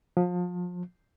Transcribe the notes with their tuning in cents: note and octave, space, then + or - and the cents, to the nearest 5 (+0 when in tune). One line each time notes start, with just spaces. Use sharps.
F3 +30